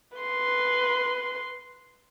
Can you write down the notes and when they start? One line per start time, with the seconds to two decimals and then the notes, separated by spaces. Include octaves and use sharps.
0.17 B4 C6